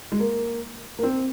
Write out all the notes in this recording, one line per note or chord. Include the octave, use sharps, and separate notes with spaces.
G#3
A#3
A#3
C4